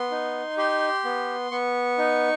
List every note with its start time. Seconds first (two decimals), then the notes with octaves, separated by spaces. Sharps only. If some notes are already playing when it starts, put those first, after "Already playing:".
Already playing: B3 C6
0.11 D#4
0.57 G4 C6
1.05 B3
1.51 B3 C#6
1.98 D#4